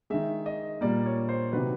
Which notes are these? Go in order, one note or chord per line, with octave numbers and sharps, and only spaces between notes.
D#3 G#3 E5
D#5
A#2 G3 A#3 D5
C#5
C5
C3 D#3 F#3 B4